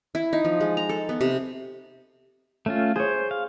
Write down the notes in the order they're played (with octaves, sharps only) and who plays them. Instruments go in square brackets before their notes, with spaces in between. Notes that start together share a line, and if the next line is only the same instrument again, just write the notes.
[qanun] E4
D#4
F3
G#3
A#5
A4
B3
C3
[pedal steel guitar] A3 C#4 F4
[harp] G#4 C#5 [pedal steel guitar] C5
[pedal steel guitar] F5